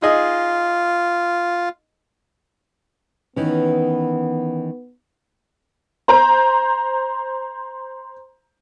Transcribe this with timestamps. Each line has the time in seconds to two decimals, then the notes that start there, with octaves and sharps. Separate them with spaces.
0.02 D#4 F4 G#4 D#5
3.36 D#3 E3 B3 C#4
6.08 C5 A#5